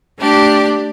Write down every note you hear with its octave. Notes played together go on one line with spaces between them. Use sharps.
A3 D4 G4 D5